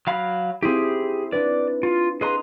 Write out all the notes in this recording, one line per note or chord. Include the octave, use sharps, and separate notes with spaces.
F#3 F5 B5
C4 E4 G4 G#4
D4 B4 D5
F4
G#4 B4 D#5 A#5 C6